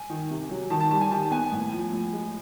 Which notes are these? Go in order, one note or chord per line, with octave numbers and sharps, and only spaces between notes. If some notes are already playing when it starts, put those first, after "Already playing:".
Already playing: G#5
D#3
C3
F#3
D#3 A5
A5
G3 A5
G#5
D#3 A5
B3 G#5
A2
F3
A2
G#3